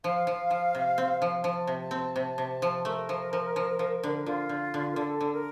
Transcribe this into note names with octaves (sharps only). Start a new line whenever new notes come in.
F3 F5
F3
F3
C3
C4
F3
F3 A5
C3
A5
C4
C3
C3
F3
A3 A#4
F3
F3
F3
F3
D3
D3 F4
D3
D3
A#4
D3 A4
D3
A#4